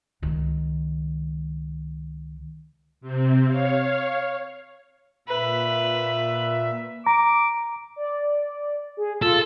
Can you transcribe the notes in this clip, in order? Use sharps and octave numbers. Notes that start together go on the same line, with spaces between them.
C#2 D#3
C3 C4
C#5 F5
A#2 B4 E5
A#5 D6
D5
G#4
F4 A4